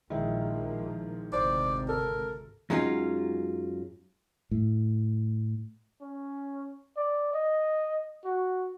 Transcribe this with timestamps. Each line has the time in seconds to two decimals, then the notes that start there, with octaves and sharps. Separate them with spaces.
0.10 A#1 D#3 F3 G#3 A#3 E4
1.33 G#1 D2 C3 C5 D5
1.89 A4 A#4
2.70 F#2 F#3 G#3 C#4 D#4 F4
4.51 A2
6.01 C#4
6.96 D5
7.33 D#5
8.25 F#4